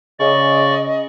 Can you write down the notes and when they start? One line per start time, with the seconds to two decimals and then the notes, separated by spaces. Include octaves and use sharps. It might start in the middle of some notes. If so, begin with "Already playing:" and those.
0.19 C#3 D5 D#5 C#6